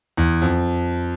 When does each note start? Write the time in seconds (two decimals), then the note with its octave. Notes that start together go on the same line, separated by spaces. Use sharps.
0.17 E2
0.42 F2